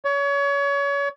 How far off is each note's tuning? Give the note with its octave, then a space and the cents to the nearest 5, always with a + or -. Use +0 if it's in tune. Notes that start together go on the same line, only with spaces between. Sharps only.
C#5 +30